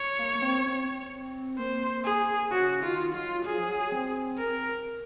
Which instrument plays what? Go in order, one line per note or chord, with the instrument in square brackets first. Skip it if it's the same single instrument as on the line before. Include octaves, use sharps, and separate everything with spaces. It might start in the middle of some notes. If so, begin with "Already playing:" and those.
Already playing: [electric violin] C#5
[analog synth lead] A#3
A#3
C4
C4
[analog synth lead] A#3 [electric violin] C5
[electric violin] G#4
[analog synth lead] C#3 [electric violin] F#4
[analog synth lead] D#3 [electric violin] F4
[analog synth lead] F#3 [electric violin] F4
[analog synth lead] F#3 [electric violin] G#4
[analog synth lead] F3
F#3
C4
[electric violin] A#4